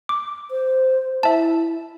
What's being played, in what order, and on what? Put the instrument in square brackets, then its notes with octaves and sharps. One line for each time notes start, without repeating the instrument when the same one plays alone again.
[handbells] D6
[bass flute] C5
[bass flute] E4 [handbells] E5 A5